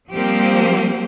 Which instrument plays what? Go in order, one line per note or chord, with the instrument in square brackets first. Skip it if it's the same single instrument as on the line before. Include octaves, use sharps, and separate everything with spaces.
[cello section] F3 G3 A#3 C4 G4 C5